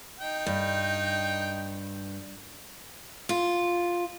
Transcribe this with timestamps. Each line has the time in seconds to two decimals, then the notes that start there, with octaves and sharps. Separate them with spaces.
0.20 D#4 G5
0.46 G2
3.29 F4